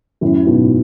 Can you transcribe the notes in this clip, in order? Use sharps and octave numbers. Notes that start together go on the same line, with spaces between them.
F#2 A2
G#2 B2